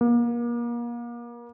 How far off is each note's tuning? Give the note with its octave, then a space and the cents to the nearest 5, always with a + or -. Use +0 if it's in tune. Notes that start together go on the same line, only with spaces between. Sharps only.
A#3 +35